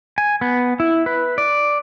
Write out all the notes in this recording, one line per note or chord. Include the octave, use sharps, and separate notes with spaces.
G#5
B3
E4
B4
D5